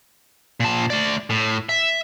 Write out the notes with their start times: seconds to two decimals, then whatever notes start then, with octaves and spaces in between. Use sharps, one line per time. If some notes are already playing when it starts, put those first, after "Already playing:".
0.60 A#2 A5
0.90 A3 D5
1.30 A2
1.69 E5